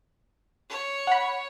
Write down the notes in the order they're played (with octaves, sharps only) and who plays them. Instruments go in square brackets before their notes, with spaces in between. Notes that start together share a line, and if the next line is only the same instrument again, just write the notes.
[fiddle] C#5
[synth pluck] F#5 B5